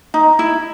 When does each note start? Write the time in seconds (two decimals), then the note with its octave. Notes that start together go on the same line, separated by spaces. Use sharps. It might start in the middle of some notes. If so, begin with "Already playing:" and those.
0.14 D#4
0.39 E4